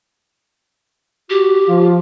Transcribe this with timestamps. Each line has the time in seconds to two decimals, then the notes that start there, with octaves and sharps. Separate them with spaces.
1.30 F#4 G4
1.67 F3 F4